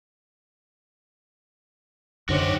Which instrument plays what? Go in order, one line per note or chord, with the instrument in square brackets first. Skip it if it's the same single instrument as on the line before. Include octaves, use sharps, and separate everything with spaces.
[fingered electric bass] F#2 D3 [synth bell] D#4 C5 C#5 [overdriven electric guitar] F#4 G4